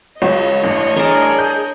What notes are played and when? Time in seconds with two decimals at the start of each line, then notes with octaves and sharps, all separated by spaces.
0.22 C#2 F#3 C#5 D#5
0.63 A1 G2
0.96 D4 G#4 A#4
1.38 G6